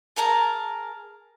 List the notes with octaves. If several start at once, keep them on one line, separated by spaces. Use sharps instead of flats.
G#4 A#4 A5 A#5